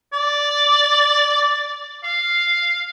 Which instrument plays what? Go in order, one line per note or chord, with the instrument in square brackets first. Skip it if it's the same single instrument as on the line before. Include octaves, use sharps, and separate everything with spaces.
[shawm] D5
F5